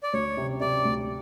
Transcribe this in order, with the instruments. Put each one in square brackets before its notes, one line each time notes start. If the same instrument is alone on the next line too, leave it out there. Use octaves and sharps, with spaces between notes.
[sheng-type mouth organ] D5
[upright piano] D2 [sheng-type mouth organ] C#5
[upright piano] C3
[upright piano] C3 [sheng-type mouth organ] D5
[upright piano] D2